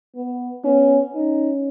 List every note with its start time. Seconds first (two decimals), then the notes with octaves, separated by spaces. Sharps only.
0.16 B3
0.65 B3 C#4
1.15 C#4 D#4